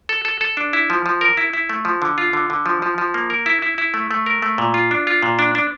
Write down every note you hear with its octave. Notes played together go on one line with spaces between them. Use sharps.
A4
A4
A4
D4
E4
F3
F3
A#4
E4
E4
A3
F3
D3
F4
D3
D3
F3
F3
F3
A#3
A#4
E4
E4
E4
A3
A3
A#4
A3
A#2
F4
D4
F4
A#2
D4
D4